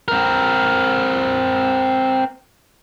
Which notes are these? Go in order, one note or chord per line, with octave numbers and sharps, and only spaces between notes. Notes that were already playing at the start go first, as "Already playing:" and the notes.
C4 A#4